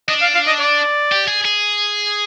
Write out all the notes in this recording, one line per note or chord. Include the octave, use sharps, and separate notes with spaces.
D4 D#5
F5
F5
D#5
D5
G4
G#4
G#4